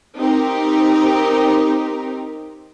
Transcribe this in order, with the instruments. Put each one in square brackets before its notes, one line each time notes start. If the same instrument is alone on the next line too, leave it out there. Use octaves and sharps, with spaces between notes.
[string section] C4 D#4 G4 A#4